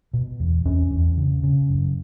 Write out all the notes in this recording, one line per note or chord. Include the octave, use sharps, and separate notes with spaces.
B2
E2
E2 C#4
E2
C#3
C#3
F#2